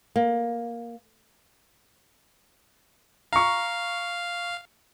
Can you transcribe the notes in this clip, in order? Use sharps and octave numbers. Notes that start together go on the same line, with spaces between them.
A#3
F5 A#5 C#6